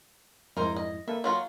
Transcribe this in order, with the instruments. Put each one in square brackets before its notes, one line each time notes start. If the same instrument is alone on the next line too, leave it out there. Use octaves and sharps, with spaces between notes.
[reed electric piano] F2 G#2 E4 [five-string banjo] D#4 A#4 C5
[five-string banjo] D#5
[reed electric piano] A#3 A4 B4 [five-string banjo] E5
[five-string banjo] F#3 F4 F#4